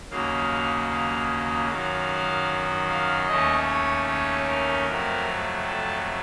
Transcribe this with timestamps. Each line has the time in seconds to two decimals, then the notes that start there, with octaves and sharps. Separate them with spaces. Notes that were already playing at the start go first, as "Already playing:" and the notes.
0.10 D#2 C#3 F#3 A#3 F5
0.90 F5
1.69 F#2 D#3 F#3 F5
2.89 F5
3.27 D#2 D#3 A3 C#4 D#5
3.68 C#5
4.07 C#5
4.46 A#4
4.86 F2 C3 F#3 A3
5.66 A4